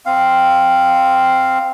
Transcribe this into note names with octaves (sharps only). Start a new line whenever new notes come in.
C4 F5